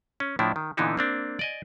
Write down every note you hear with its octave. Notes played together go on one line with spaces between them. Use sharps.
C#4
A2 F3 D4 E4
D#3
A#2 D3 E3 B3 D#4 E4
A#3 C4 D4
D5 D#5 G#5